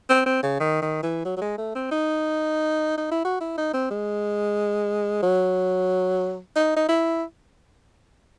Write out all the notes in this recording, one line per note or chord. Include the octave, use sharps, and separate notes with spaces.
C4
C4
C#3
D#3
D#3
E3
F#3
F#3
G#3
A3
C4
D#4
D#4
E4
F#4
E4
D#4
C4
G#3
F#3
D#4
D#4
E4